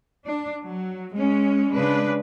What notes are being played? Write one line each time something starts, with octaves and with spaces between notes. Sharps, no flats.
D4
F#3
G#3 C#4
C#3 G#3 D4 B4